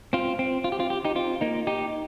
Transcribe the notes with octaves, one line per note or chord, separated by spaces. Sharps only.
C4 F4
C4
F4
G4
C4 F4
G4
D#4 G4
C4 F4
A#3 D#4
D#4 G4